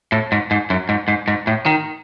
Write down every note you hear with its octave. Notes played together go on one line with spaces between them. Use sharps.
A2
G#2
G#2
F#2
G#2
G#2
G#2
A2
D#3